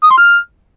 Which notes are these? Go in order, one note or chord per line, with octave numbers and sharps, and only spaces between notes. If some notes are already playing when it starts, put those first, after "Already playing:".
D#6
C6
F6